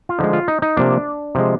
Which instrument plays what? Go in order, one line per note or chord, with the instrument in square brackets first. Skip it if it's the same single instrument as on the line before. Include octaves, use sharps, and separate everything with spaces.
[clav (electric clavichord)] F4
D3 F3 G#3 D#4
F4
D#4
D#4
C3 F3 A#3 D4
C3 F3 G#3